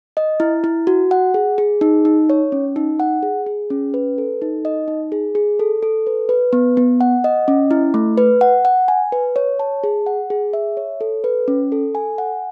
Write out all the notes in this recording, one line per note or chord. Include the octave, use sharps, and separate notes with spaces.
D#5
E4
E4
F#4
F#5
G#4
G#4
D#4
D#4
C#5
C#4
D#4
F#5
G#4
G#4
C#4
B4
A4
D#4
D#5
D#4
G#4
G#4
A4
A4
B4
B4
B3
B3
F#5
D#5
C#4
E4
A3
B4
F#5
F#5
G#5
B4
C#5
A5
G#4
F#5
G#4
E5
C#5
A4
B4
C#4
A4
G#5
F#5